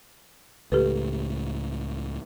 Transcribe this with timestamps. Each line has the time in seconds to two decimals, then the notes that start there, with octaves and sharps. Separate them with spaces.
0.72 C#2 A2 G4 A4 B4